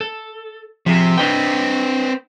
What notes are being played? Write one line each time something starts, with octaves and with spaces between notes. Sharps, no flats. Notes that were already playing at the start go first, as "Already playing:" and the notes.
A4
C3 F3 G#4
C4 D4 B4 D#5 G5